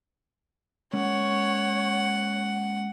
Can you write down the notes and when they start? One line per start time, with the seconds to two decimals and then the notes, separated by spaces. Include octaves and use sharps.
0.93 G#3 A#3 C#4 C#5 F#5